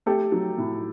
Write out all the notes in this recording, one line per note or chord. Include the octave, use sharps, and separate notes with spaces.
A3 G4 A4
F#3
A2